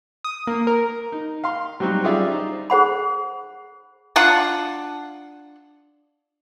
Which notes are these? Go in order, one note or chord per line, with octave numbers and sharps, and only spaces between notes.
D#6
A#3
A#4
D#4
F5 C6
F#3 G3 C4 D#4 F#4
G3 C#4 F4 G#4 D5 E5
D#4 C5
G#4 C5 F#5 B5
D4 F4 F#5 A5